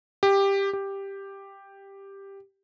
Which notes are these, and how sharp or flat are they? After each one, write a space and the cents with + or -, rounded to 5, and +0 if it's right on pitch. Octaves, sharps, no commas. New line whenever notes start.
G4 +10
G4 +5